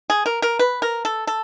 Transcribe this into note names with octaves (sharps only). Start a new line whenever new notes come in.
G#4
A#4
A#4
B4
A#4
A4
A4